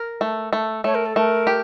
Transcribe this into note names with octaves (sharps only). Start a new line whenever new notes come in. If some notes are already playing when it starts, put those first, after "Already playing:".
Already playing: A#4
A3
A3
A3 C#5
A#4
A4
A3 A#4
G4